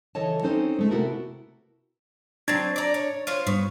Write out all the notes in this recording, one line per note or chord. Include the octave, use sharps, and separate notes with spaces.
C#3 E3 A4 C#5 D#5 A5
C4 C#4 D#4 A4 C5
G#3 A3
C3 B3 E4 F#4 A4 A#4
F#3 C4 D4 G#6 A6
D5 A#5
C#5
F4 C5 C#5
G2 B3 C#6